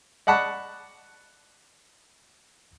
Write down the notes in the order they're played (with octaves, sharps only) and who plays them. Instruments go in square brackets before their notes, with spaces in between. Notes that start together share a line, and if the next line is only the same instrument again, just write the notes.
[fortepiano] D5 D#5 F#5 A5 B5 C#6